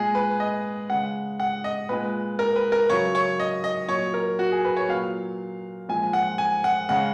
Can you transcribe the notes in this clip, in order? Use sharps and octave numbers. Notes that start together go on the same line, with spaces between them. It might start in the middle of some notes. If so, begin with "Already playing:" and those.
Already playing: A#2 G#3 G#4
B4
D#5
C#3 G#3 F#5
F#5
D#5
A#2 G#3 B4
A#4
B4
A#4
C#3 F#3 C#5
C#5
D#5
D#5
A#2 F#3 C#5
A#4
F#4
G#4
B4
C#5
A#2 F#3 F5
A#2 F3 G#3 G#5
F#5
G#5
F#5
C#3 G#3 F#5